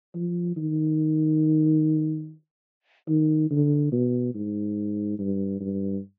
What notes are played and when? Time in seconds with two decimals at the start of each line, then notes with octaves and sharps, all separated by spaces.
0.15 F3
0.57 D#3
3.08 D#3
3.51 D3
3.92 B2
4.34 G#2
5.19 G2
5.60 G2